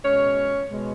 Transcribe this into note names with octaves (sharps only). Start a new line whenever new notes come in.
B2 G#3 C#4 C#5
B2 G#3